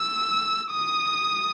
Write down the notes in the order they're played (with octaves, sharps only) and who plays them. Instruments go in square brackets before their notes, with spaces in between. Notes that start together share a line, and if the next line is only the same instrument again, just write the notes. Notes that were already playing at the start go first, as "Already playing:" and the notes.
Already playing: [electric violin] E6
D#6